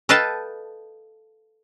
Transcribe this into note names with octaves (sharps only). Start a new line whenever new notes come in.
A4 B4 D#5 F5 G5 A5